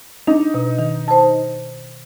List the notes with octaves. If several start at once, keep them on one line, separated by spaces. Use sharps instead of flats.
D4 D#4
B2
D#3
C5 A5